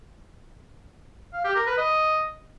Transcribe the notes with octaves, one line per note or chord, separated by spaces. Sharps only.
F5
G4
A#4
B4
D#5